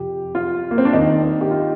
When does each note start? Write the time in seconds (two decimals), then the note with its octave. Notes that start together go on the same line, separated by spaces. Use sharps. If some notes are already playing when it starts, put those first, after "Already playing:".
Already playing: F2 C3 F3 G4
0.35 F4
0.71 A#3
0.78 C4
0.85 D4
0.93 D#2 D#3 D#4
1.41 G4
1.51 F4